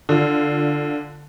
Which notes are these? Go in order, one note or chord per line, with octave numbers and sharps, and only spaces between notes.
D3 F4